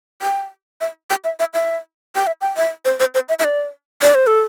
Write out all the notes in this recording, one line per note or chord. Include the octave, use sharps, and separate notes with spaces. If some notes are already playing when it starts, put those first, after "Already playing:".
G5
E5
G5
E5
E5
E5
G5
E5
G5
E5
C5
C5
C5
E5
E5
D5
D5
C5
A4